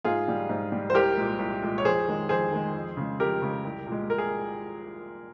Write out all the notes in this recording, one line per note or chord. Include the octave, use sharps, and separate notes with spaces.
G#2 F4 G#4
G3
G#2
G3
C5
C2 G4 A#4
A#2 G#3
C2
A#2 G#3
C#5
F2 G#4 C5
D#3 G#3
F2 G#4 C5
D#3 G#3
F2
C#3 G#3
F2 G4 A#4
C#3 G#3
C2
A#2
G#3
A#4
G#4